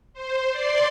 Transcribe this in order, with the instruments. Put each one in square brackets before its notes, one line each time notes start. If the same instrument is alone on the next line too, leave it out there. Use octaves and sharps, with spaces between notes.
[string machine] C5
D5 C6